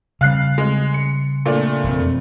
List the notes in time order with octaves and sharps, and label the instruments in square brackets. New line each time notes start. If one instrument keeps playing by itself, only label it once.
[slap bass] C#3 G3 [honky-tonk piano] F5 F#6 C7
[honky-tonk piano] G#3
C#7
A#2 A3 D4
[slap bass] E1 F2 C4